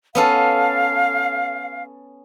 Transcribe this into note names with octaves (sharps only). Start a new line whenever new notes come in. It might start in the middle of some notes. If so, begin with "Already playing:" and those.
B3 C#4 A4 F5